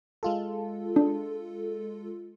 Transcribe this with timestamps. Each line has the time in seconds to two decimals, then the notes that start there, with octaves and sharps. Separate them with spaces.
0.23 G#3 F4 A4
0.96 D4